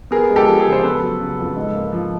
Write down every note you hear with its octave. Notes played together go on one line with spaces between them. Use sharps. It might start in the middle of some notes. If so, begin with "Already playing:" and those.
B3 G#4 A#4
G#3
G4 A4
F3
G#4 A#4
C#3
C5
B3 A4 B4
F#3
C#3
F2
G#2
A#3
F3